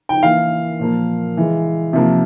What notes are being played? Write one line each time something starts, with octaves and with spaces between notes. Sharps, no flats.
G5
E3 A#3 F5
A#2 F3 A#3
E3 G#3
C3 F3 A#3